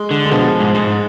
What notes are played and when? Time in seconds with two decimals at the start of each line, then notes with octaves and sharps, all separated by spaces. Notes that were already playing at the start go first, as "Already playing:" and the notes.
Already playing: G#3
0.11 D3
0.26 G#3
0.32 B2 F3
0.60 G#2
0.75 G#2 G#3